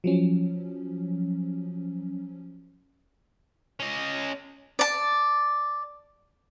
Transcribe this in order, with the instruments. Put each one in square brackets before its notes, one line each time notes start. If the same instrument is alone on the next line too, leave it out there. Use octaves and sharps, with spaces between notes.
[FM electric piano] F3 F#3 C#4
[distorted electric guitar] C#4 D#5
[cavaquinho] D5 A5